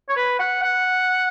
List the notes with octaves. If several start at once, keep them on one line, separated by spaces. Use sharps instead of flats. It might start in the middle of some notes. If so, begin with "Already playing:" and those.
C#5
B4
F#5
F#5